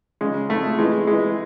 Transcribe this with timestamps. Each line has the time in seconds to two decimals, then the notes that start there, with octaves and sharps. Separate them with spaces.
0.21 C#3 G#3
0.49 F2 A3
0.79 E3 G#3
1.07 E3 G#3